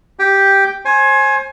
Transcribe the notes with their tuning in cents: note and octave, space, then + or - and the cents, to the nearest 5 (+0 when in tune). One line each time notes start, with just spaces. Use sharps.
G4 +0 G5 +0
C5 +35 G#5 +10